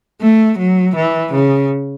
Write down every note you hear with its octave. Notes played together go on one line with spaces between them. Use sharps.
A3
F#3
E3
C#3